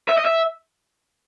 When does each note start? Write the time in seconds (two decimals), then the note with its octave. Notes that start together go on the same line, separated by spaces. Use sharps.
0.09 E5
0.17 D#5
0.25 E5